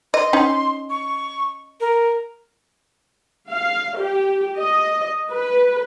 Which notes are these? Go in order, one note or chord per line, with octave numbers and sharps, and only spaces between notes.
D#5 C6
C#4 D#4
C#6
A#4
F5
G4
D#5
B4